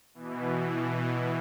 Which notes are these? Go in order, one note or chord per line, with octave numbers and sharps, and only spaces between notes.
B2 E3